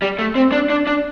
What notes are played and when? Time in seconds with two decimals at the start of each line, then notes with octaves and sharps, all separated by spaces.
0.02 G3
0.19 A3
0.35 C4
0.52 D4
0.70 D4
0.87 D4